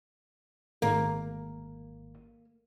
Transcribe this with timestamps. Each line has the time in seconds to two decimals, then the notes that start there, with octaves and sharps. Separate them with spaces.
0.82 G#1 A#3